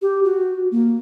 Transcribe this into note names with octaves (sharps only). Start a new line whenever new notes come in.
G4
F#4
A#3